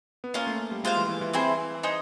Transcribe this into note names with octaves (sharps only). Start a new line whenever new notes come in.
B3
A#3 C#4 F4 A#4
A3
G3
G#3 F4 G#4 C5 F5
E3
E3
E3
C4 E4 G#4 C5
D#4 G#4 C5